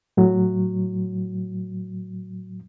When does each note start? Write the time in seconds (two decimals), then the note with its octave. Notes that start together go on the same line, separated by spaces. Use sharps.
0.17 A2 F#3